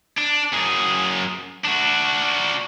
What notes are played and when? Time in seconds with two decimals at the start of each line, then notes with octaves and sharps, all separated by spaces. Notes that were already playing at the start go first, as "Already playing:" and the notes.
0.18 D4
0.53 F#2 G#4
1.65 D4 F#4